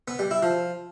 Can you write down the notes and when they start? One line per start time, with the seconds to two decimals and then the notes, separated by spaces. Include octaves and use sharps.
0.08 B3
0.19 G3
0.31 E4
0.43 F3